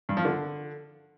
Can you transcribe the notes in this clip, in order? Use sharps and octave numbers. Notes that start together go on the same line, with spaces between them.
G2
F3
D3